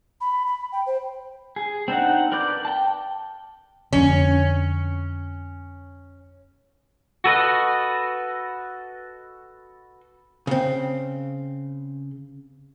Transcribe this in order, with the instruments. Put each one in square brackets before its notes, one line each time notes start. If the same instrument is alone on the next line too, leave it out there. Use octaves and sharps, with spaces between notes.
[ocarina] B5
B5
G5
C5
[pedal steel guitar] G#4
C4 D4 D#4 F#5
A#4 B4 D5 D6 G6
G5 A5
[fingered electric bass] F2 D3 [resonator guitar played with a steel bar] C#4
[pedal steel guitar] F#4 A4 B4 D#5
[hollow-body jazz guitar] C#3 C4